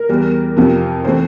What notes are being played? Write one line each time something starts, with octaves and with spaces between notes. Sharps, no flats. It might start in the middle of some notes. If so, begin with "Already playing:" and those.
Already playing: A#4
E2 E3 G3
F2 C3 F3
E3 A3 C4 C5